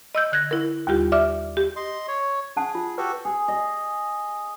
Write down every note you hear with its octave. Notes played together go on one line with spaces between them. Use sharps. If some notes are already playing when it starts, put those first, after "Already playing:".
D#5 E6 G6
D3 F#6 G#6 A#6
E4 A#4
D#2 G3 F4 G4
D5 E5 D6 F6
G4
D#5 C6
C#5
C#4 G#4 F#5 A5
F4
F#4 G4 A4 B4
G#4
D#5